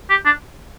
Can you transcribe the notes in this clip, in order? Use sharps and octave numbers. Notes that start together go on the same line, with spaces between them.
G4
D4